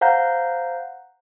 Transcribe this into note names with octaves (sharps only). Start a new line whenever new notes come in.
C5 F5 F#5 A#5 G6